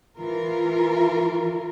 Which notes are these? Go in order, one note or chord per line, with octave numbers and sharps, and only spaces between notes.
E3 F4 A#4